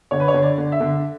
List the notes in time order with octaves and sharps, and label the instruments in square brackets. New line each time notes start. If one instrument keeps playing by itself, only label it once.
[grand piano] D3 [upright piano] C#5
[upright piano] B4
C#5
[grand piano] D3
[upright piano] D5
[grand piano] D3
[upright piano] E5
[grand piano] D3